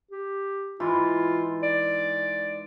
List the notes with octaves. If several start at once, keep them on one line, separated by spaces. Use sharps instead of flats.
G4
G#2 E3 E4 F4
D5